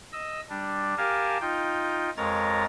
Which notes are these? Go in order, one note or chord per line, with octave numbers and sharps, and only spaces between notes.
D#5 E6
G3 D4
G4 A#4 F5 G#5 A5
D#4 F4 G5
F2 G#3 A#4 C#5 A#5 A6